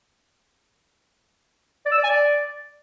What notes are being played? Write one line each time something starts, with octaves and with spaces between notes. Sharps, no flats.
D5
E6
D5
G#5
D5